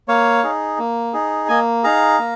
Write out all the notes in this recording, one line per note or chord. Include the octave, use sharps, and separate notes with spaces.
A#3 C#5 F5
D#4 G#4
A#3
D#4 G#4
A#3 D#5 G#5
D#4 G#4 F5 A#5
A#3